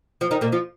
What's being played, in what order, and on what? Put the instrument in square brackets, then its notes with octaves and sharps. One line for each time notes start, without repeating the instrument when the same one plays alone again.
[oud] F3 F4
D#3 D#4
A#2 A#3
F3 F4